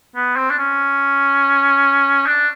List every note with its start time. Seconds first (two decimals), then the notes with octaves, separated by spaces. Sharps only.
0.16 B3
0.36 C4
0.50 D4
0.58 C#4
2.26 D4